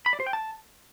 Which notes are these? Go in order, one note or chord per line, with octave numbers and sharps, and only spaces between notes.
B5
D5
C5
G5
A5